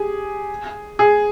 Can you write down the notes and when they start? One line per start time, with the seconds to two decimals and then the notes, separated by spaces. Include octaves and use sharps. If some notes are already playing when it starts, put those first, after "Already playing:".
Already playing: G4 G#4
0.99 G#4